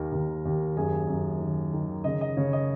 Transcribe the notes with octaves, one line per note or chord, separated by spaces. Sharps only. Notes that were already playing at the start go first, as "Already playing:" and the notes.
Already playing: D#2 D#3 A#4
D#2
D#2
F#2 G#4 G#5
F#2
D#3
D#3
C#3 D#5
D#5
C#3 C#5
D#5